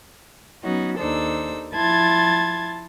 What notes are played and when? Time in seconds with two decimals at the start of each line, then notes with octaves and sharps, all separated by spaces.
0.63 F#3 B3 C#4 D#4 F#4
0.99 D#2 D4 D#4 A4 C5 E6
1.75 F3 E4 A5 C6 G#6 A6